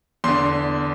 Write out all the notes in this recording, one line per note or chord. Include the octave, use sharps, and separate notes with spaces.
E2 D3 C6